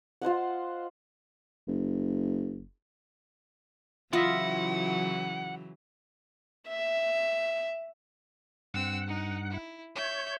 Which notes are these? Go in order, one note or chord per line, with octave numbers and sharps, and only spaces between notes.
F4 C5 D#5 F#5
F#1
C#3 E3 F#3 E4 F4 D#5 E5 F#5
E5
G2 C4 F#5 E6
D#4
E4
C#5 E5 G6